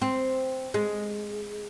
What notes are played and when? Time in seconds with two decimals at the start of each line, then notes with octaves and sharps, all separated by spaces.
0.02 C4
0.74 G#3